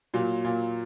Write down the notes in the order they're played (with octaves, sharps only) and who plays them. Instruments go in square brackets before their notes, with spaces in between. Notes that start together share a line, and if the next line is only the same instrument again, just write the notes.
[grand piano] A#2 F#3
A#2